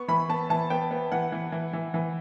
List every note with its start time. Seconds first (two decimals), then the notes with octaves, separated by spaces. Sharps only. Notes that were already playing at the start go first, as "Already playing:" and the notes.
Already playing: B3 C#6
0.08 E3 B5
0.29 B3 A5
0.50 E3 A5
0.70 B3 G5
0.91 B3
1.12 E3 F#5
1.32 E3
1.52 E3
1.73 E3
1.94 E3